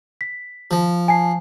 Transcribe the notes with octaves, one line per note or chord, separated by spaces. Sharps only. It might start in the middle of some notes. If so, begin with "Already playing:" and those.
B6
F3
G#5 A5 C7